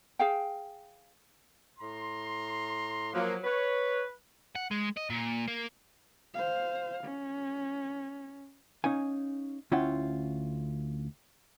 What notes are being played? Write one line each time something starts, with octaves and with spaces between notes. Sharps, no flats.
G#4 F5 G5
A2 A#5 C6
F3 F#3 A#3
B4 C#5
F#5
G#3
D#5
A#2
A#3
C5 F5
C#4
C#4 D#4 F5 G#5
D2 C#4 E4 F4 F#5 G5